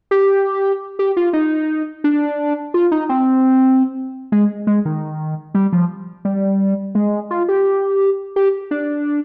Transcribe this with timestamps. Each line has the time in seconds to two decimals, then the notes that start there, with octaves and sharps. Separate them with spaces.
0.11 G4
0.99 G4
1.17 F4
1.33 D#4
2.04 D4
2.74 F4
2.92 D#4
3.09 C4
4.32 G#3
4.67 G#3
4.85 D#3
5.55 G3
5.73 F3
6.25 G3
6.95 G#3
7.31 F4
7.49 G4
8.36 G4
8.71 D4